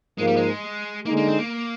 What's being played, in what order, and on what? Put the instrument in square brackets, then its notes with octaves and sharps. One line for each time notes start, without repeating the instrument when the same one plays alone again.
[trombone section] G#2 F3 A#3 [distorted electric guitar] G#3
[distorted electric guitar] G3
G#3
[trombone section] D3 G#3 D#4 [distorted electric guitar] A#3
[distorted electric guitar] A#3
C4
A#3